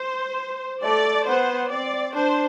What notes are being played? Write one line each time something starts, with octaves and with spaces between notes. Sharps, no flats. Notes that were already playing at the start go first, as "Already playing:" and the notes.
Already playing: C5
A3 D5
B3 C5
C4 D5
D4 C5